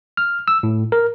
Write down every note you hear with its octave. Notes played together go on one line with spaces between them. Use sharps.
F6
E6
A2
A#4